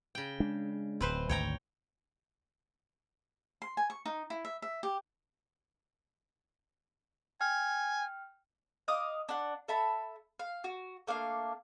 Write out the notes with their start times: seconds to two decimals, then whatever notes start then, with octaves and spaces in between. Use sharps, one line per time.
0.15 C#3 G5
0.40 G#3 D4
1.01 D1 C4 B4 C5
1.29 G#1 D2 C#5 G5 A#5
3.62 C6
3.77 G#5
3.90 C#6
4.06 D#4
4.30 E4
4.45 E5
4.62 E5
4.83 G4
7.41 G5 G#5 F6
8.88 D#5 F5 D6 D#6
9.29 D4 F#5
9.68 A4 E5 A5 B5
10.39 F5
10.64 F#4
11.07 A3 A#3 D4 F5